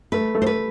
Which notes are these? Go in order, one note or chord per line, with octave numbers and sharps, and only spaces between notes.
A3 B4
A3
C5
B4